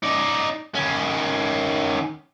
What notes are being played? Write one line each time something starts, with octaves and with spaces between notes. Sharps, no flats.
D#4 D5
D#3 C#4